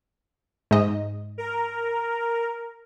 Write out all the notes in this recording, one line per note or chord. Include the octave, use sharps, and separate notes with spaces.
G#2 D#5
A#4